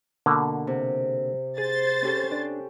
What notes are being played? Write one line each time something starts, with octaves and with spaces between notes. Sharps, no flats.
B2 D3 A#3
C3
G#4 C5 A6
C#4 G4 A4
D4